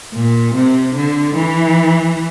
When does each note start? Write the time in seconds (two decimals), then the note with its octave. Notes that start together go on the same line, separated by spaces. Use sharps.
0.14 A#2
0.55 C3
0.95 D3
1.36 E3